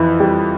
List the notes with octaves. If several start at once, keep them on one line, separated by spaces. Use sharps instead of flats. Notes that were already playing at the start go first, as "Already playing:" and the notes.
Already playing: F2 E3
G3